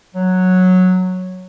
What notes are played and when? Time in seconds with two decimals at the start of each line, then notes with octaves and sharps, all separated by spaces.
0.15 F#3